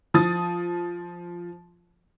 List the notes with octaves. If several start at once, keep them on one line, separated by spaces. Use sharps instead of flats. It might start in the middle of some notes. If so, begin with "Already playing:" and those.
F3 D#6 A6